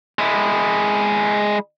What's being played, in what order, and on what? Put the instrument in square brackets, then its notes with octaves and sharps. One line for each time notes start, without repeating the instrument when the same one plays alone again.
[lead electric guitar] G#3 E4